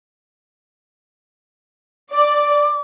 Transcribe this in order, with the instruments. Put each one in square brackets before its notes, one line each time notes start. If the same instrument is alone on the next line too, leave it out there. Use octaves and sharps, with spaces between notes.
[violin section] D5 [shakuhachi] D6